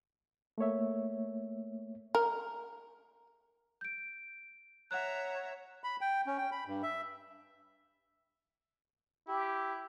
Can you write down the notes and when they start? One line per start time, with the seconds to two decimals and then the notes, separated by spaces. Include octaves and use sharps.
0.58 A3 A#3 C#5 E5
2.15 A#4
3.81 G6 D7
4.91 C#5 E5 F#5 A#5 F#6
5.84 B5
6.01 G5
6.27 C#4
6.38 G5
6.52 B5
6.66 G2
6.83 E5
9.28 E4 G4